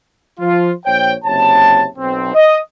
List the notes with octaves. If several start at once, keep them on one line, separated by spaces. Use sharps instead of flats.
F3 F4
A#1 C5 C#5 G5
F#1 C3 C#5 A5
B1 C4
D#5